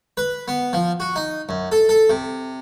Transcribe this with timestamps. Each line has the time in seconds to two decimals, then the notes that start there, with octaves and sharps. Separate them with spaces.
0.17 B4
0.48 B3
0.73 F3
1.00 F#4
1.16 D#4
1.49 F#2
1.72 A4
1.89 A4
2.10 C3